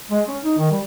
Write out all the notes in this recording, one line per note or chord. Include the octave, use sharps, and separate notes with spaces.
G#3
C#4
D#4
D#3
G3